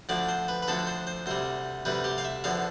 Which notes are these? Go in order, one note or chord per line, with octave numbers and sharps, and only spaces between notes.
D2 D3 F3 D5
C5
B4
B4
D2 D3 F3 A4
C5
C5
D2 C3 G3 C5
D2 C3 G3 B4
G4
F5
E5
E2 D3 F3 F5